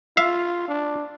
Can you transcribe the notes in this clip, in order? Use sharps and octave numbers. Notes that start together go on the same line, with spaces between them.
F4 E5 F5
D4